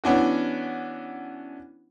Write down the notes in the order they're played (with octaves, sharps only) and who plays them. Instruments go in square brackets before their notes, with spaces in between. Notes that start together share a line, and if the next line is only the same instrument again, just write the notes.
[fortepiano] E3 B3 C#4 D4 F#4